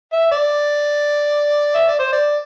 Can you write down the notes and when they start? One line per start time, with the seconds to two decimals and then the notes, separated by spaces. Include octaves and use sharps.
0.12 E5
0.32 D5
1.75 E5
1.88 D5
1.99 C5
2.13 D5